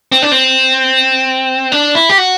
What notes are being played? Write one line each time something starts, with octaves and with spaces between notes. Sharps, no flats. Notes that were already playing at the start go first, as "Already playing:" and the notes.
C4
D4
C4
D4
E4
G4
F#4